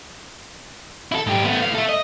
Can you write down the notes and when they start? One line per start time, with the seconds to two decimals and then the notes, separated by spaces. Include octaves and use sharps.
1.12 E4 A4
1.27 G#2 G4
1.44 A3 B3
1.62 A2 F5
1.75 A4 E5
1.89 D#5